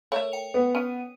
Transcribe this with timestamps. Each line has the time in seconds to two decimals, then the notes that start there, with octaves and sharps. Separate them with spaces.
0.12 A3 A4 A#4 C#5 E5
0.32 G5 C#7 F7
0.54 B3
0.75 C#4 D#7